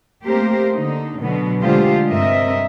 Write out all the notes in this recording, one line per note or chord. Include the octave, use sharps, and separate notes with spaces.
A3 A#3 C4 G4 A#4 C5
D3 D#4
B2 D3 F#3 B3
D3 G#3 A3 F4 G4 C5
G2 C3 C4 A#4 D#5 E5